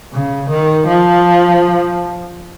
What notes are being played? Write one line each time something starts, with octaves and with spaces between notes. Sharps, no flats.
C#3
D#3
F3